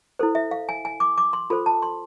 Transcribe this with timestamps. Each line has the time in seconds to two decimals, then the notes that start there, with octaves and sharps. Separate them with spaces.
0.19 E4 A4 C5
0.35 E5
0.51 F5
0.69 G#5
0.85 G#5
1.00 D6
1.18 D6
1.33 C6
1.50 F4 A4 C5 B5
1.66 A5
1.82 C6